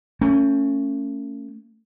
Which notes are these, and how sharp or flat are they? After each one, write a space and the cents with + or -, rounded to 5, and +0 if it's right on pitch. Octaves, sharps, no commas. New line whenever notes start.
A3 +35 C#4 +0